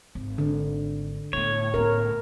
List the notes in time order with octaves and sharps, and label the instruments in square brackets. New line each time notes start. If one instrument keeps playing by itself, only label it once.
[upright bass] G#1
[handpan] D3
[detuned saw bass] A2 [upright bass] A3 B3 [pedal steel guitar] C#5
[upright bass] B3 C#4 [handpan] A#4